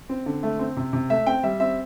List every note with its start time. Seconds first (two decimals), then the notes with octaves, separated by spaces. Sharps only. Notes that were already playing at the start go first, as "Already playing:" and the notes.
0.09 C4
0.26 D3
0.43 A3
0.59 C4
0.77 C3
0.93 C3
1.10 A3 E5
1.26 C4 G5
1.43 G3 E5
1.60 C4 E5